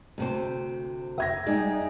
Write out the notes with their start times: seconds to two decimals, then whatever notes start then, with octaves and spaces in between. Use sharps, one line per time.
0.18 D2 C3 C5
1.18 E5 G#6 A#6
1.46 G3 G#3 D#4 G4